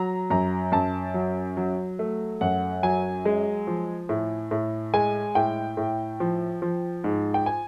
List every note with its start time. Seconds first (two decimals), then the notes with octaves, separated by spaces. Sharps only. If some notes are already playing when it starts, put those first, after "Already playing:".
Already playing: F#3 A#5
0.30 F#2 A#5
0.72 F#2 A5
1.14 F#3
1.57 F#3
1.99 A3
2.41 F#2 F#5
2.83 F#3 G#5
3.25 G#3
3.67 F3
4.09 A2
4.51 A2
4.94 G#3 G#5
5.35 A2 G5
5.77 A2
6.20 F3
6.62 F3
7.04 G#2
7.34 G5
7.46 G#5